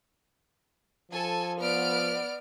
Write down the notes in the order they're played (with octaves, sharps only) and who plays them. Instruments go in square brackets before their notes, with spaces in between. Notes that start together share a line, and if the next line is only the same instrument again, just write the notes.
[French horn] F3 [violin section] A4 G#5
[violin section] B3 F6 D7 [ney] D5